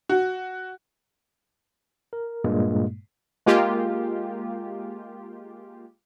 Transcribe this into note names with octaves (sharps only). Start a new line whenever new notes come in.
F#4
A#4
G2 A#2 G#3 A#3
G#3 A#3 F4 G4